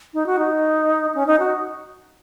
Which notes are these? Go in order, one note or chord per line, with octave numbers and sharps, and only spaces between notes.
D#4
F#4
D#4
C#4
D#4
F#4